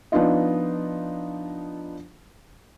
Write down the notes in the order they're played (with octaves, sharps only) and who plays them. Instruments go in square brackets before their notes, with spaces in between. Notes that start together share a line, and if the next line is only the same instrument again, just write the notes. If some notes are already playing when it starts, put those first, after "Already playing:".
[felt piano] F3 B3 D4 D#4 F4 D#5